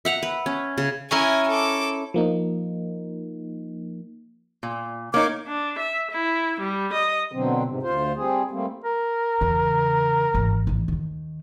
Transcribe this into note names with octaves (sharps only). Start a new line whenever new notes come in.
E5 F#5 A#5
B4
C#4
C#3
C#4 E4 A#4 G#5
A4 D6
F3 A#3 D#4
A#2
A#3 D#4 C#5 D6
D4
E5
E4
G3
D#5
B2 D3 F#3 C4
G#2 C3
D2 F4 C5
G3 C4 G#4
G3 A3 A#3 C4
A#4
E2 C#3
G#1 E3
A1 D#3
D#2 D#3